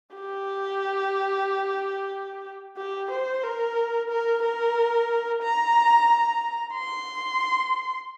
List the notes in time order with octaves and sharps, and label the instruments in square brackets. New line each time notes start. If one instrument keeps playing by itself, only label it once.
[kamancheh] G4
G4
C5
A#4
A#4
A#4
A#5
C6